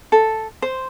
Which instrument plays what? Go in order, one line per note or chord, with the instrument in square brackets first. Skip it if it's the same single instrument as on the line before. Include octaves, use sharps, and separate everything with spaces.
[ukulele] A4
C5